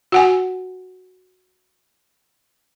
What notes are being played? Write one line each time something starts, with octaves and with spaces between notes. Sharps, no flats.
F#4 F#5 G#5